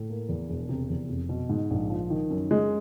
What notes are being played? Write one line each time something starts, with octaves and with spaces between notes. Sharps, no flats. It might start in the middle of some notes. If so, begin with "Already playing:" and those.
Already playing: A2
A#3
E2
E1
C3
E2
F1
B2
G#2
A#1
F3
D#3
F#2
G#3